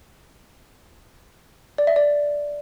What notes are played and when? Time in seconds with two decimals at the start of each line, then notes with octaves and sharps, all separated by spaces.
1.78 D5
1.87 E5
1.96 D5